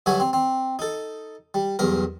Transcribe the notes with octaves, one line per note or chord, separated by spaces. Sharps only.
G2 D3 F#3 F#4 E5 G#5
C4
C4
D#4 A4
G3
B1 E2 G2 A#4